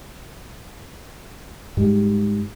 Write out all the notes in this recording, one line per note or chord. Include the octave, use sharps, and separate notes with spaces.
G#2 G3